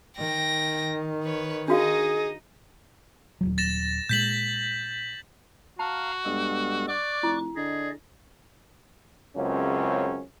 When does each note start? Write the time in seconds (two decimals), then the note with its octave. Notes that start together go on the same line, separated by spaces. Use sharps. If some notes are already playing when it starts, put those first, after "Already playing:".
0.17 D#3 G5 A#6
1.24 B4 C#5
1.68 D4 D#4 F#4 G#4 D#5 F5
3.41 D#1 A#1 F#3
3.58 A6 A#6 E7
4.09 A#2 G#3 G6 B6 F#7
5.79 F#4 F5 A5 A#5 F6
6.26 G2 G#3 B3 A4
6.88 D5 C#6 D6 F#6
7.23 F1 E4
7.56 D3 G#4 D5 D#5
9.37 C#2 F#2 C#3 C4 C#4